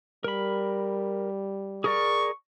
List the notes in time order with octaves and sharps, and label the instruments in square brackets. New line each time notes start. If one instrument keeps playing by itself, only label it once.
[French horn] G3 [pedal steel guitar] A#4 B5
[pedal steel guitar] G#4 A#4 D5 [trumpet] C#6